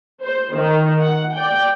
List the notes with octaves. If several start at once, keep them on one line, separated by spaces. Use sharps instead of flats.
C5
D#3
F#5
D5 G5